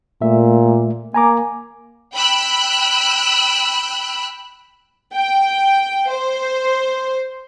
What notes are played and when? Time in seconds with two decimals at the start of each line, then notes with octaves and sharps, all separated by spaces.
0.22 A#2 A3 E5
1.14 A#3 G#5 A#5 D6
2.13 G5 B5 E6 F#6
5.13 G5
6.10 C5